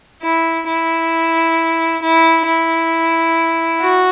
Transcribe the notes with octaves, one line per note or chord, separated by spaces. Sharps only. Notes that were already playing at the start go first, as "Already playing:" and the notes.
E4
E4
E4
E4
F#4